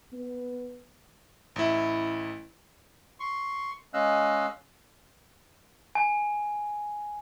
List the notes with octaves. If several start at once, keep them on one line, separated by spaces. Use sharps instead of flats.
B3
A1 E4
C6 C#6
G#3 C#4 D#5 F5 E6 F#6
G#5